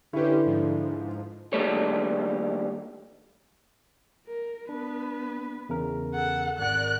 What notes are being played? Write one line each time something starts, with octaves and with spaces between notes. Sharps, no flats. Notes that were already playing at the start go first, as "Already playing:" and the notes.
D3 C#4 E4 G4 B4 C5
G#2 F3
D#2 C#3 G3 A3 C#5
A#4
B3 D4 B4
E2 C#3 A#4
A4 F#5
G#1 A#4 D5 F#5 F#6